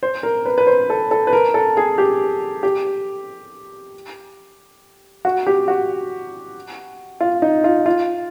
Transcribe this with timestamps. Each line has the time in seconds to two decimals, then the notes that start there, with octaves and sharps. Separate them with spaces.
0.03 C5
0.23 A#4
0.46 B4
0.58 B4
0.67 C5
0.90 A4
1.11 A4
1.27 B4
1.33 A#4
1.54 A4
1.77 G#4
1.98 G4
2.63 G4
5.25 F#4
5.47 G4
5.68 F#4
7.21 F4
7.42 D#4
7.64 F4
7.86 F4